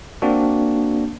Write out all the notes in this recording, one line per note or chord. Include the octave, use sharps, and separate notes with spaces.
A#3 C4 D4 F#4